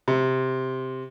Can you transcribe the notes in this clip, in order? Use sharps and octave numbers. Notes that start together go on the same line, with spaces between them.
C3